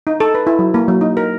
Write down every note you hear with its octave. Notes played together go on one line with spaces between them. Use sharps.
D#4
A4
B4
E4
F#3
A#3
F#3
D#4
A#4